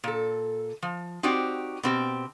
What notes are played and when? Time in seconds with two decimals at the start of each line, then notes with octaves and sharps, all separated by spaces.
0.04 A#2 A4
0.82 F3
1.23 C4 D#4 F#4 G4 C5 D5
1.83 B2 C4 G4